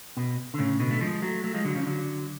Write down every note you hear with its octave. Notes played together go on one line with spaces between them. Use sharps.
B2
D3
A2 C#3
B2 D3
A3
F3 G#3
F#3 A3
F#3 A3
F3 G#3
D3 F#3
C#3 F3
D3 F#3